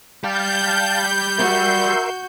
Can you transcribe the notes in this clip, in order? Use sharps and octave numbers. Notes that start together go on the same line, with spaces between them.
G3 G4 F5 A5 G6
F#4 A#4 E5 C6